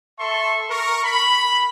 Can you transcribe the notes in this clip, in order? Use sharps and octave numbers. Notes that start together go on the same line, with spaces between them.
A4 E5 A5 C6 C#6
A#4 C#6
B5